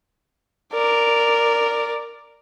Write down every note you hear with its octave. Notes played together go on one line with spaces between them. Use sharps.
A#4 D5